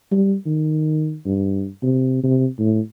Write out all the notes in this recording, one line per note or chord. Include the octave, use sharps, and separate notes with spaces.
G3
D#3
G2
C3
C3
A2